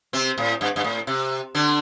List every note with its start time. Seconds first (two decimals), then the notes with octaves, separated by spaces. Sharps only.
0.13 C3 C4
0.38 A2
0.61 G2
0.76 G2
0.84 A2
1.07 C3
1.55 D3 D4